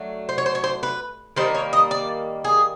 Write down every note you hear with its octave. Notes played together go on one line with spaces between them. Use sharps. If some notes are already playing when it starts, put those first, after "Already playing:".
Already playing: F#3 A3 D4
C5
C#5
C5
C#5
C5
B4
D#3 G3 A#3 C5
C#5
D#5
D5
G#4